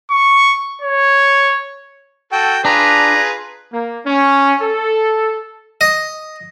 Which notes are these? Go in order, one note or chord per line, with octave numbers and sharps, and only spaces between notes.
C#6
C#5
F#4 A4 G5
D4 F4 G#4 B4 A#5
A#3
C#4
A4
D#5